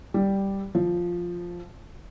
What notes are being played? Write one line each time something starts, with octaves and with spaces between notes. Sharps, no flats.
G3
F3